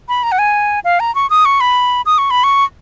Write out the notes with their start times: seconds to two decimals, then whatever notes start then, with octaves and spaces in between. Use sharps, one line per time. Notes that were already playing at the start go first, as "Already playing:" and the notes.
0.09 B5
0.23 A#5
0.32 F#5
0.39 G#5
0.84 F5
1.00 A#5
1.15 C#6
1.30 D#6
1.45 C#6
1.61 B5
2.06 D#6
2.18 C#6
2.31 B5
2.44 C#6